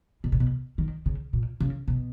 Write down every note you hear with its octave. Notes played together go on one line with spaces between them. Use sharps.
B2
A#2
B2
D#3
C#3
A#2
C#3
B2